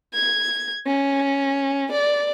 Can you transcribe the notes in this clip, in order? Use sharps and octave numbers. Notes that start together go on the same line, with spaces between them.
G#6
C#4
D5